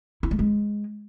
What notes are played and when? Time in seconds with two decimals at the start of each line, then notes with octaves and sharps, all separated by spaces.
0.23 E4
0.31 A3
0.39 G#3